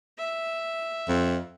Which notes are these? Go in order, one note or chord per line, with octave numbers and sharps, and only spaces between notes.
E5
F2